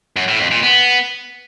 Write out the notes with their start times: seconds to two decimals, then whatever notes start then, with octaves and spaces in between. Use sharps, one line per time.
0.16 F#2
0.28 A2
0.40 F2
0.51 A#2
0.63 B3